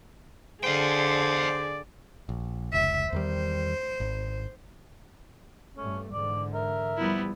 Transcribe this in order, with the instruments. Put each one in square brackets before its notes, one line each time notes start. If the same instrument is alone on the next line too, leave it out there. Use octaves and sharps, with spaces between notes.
[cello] D3 G#4 [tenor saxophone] C5 [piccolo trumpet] D5 [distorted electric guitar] F5 G5
[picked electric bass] A#1
[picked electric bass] F1 C#2 [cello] E5
[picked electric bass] E2 D#3 G3 [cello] C5
[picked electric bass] G#1
[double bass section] G2 A3 [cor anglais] C#4
[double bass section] G#2 D3 E3 [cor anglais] D5
[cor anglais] A#4 [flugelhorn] E5
[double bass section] F3 G3 [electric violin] B3 E4